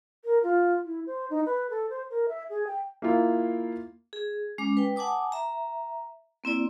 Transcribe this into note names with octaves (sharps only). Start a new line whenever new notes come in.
A#4
F4
E4
C5
D#4
B4
A4
C5
A#4
E5
G#4
G5
A#3 E4 F4
G#4
G#3 C#4 D6
B4 G5
F#5 G#5 A5 D6 D#6
E5 A#5
A#3 C4 E4 D5